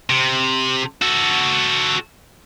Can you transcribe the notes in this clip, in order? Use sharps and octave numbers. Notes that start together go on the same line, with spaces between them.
C3
F#4 A4